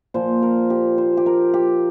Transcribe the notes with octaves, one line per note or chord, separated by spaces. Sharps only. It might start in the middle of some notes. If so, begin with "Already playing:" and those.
A#2 F3 C5
A#4
G4
C5
G4
A#4
G4